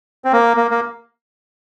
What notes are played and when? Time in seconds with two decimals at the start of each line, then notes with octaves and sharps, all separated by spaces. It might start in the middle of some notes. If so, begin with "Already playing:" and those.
0.24 C4
0.32 A#3
0.57 A#3
0.71 A#3